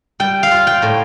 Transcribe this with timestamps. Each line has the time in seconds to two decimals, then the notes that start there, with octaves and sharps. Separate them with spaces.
0.20 G3 G5
0.43 F5
0.51 F4
0.67 G5
0.82 A2